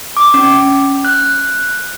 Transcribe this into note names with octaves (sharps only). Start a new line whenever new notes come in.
D6
C#4
F#6